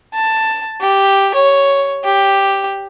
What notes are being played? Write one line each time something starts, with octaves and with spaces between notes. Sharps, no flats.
A5
G4
C#5
G4